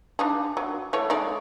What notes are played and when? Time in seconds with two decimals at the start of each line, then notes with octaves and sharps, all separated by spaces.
0.19 D4 D#4 G#4
0.57 F#3
0.93 E3 A3 C#5
1.10 G#3 D#4 D5